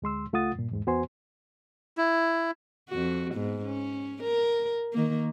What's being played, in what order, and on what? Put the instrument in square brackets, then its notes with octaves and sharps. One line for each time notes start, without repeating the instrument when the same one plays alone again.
[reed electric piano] D2 G#3 C6 E6
C#2 A3 F4 F#5 D#6 A6
G2 A#2
E2 G#2 G#3
E2 B3 F#4 C5 G#5 C6
[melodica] E4
[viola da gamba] F2 F#4
G#2 B3
C#4
A#4
D#3 A#3